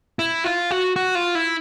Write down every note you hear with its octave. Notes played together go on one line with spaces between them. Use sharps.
E4
F4
F#4
F#4
F4
E4